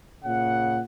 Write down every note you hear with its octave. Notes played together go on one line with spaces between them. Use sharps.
A#2 C#3 F#5